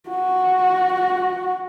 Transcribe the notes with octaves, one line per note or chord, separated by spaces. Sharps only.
F#4